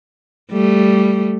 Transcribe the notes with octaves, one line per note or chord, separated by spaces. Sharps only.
G3 A3